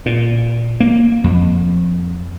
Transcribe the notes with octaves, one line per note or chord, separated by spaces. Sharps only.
A#2
A#3
F2